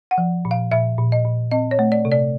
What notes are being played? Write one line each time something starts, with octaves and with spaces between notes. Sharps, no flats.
F#5
F3
A#2
F5
A#2 E5
A#2
D#5
A#2
C4 D#5
C#5
A3
D5
C3
D5